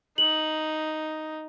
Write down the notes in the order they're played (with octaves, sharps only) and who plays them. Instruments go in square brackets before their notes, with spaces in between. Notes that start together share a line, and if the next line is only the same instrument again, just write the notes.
[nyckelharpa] D#4 [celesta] F#7